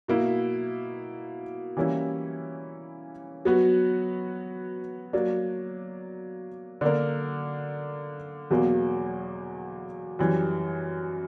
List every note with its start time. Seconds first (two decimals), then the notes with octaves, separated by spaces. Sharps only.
0.08 B2 A#3 E4
1.77 E3 G3 A#3 C#4 E4
3.45 F#3 B3 F#4
5.13 F#3 A#3 D4
6.81 D3 A#3 D4 A#4
8.51 E2 B2 F#3 A#3
10.19 F#2 E3 G3